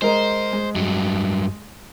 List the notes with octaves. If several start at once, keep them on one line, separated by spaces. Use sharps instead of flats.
G#3 A#4 C5 D#5
G#3
G2 F#3